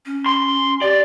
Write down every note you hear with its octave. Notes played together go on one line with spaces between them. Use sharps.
C#4
C6
G4 D5